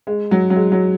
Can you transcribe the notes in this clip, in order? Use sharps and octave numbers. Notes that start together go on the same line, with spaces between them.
G#3
F#3
F#3
G#3
F#3